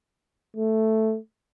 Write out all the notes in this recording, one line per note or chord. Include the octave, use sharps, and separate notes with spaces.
A3